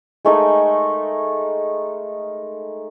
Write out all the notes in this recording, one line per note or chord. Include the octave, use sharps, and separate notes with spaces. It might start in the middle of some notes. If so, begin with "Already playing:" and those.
G#3 A3 D#4 A#4